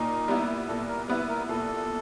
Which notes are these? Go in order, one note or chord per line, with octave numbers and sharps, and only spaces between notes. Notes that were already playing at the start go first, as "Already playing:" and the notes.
Already playing: A#2 D#4
G3 B3 E4
A#2 A4
A#4
G3 B3 E4 B4
A#4
A#2 A4